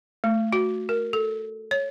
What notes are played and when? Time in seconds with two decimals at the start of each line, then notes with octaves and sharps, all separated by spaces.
0.24 A3
0.53 F#4
0.89 A#4
1.13 A4
1.71 C#5